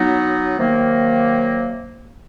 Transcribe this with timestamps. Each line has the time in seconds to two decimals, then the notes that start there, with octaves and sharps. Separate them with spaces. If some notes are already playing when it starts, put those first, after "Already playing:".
Already playing: F#3 B3 D#4
0.58 C3 D#3 F#3 A#3